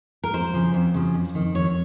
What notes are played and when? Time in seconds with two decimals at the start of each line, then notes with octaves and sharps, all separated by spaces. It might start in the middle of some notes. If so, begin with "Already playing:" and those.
0.24 A#4
0.34 F2 C5
0.54 C#3 F3
0.74 F2
0.94 C#3 F3
1.14 F2
1.35 D#3
1.55 F2 C#5